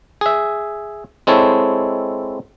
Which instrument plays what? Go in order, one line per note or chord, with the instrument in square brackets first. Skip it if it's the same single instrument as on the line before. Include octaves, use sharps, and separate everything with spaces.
[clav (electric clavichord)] G#4 E5
G#3 C4 E4 A4 C#5